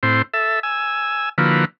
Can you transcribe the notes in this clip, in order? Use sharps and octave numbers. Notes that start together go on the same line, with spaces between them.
A2 C4 E4 C5
A4 E5
G#5 E6
D3 F3 A#3 E4 F#4 B4